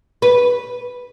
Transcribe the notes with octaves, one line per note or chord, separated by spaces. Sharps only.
B4